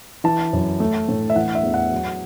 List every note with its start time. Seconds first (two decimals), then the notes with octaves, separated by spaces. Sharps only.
0.24 E3 A5
0.53 F#2
0.80 A3
1.09 A2
1.30 E5
1.35 E3 F#5
1.55 E5
1.63 E2
1.74 F#5
1.92 F#3